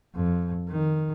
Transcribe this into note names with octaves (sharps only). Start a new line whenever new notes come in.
F2
D#3